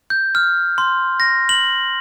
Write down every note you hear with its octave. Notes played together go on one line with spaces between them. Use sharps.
G6
F6
C6
A#6
F#7